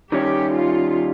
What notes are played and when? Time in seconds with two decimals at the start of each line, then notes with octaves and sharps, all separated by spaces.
0.12 D#3 G3 C#4 G4
0.56 F4